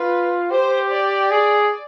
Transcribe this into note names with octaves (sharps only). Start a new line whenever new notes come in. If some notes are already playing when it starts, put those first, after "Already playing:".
Already playing: F4 B4
G4 C5
D5
G#4